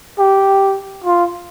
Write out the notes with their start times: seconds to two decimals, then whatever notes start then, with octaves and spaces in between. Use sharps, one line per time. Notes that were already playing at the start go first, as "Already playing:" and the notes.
0.19 G4
1.04 F4